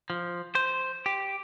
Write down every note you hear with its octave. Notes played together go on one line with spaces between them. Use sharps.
F3
C5
G4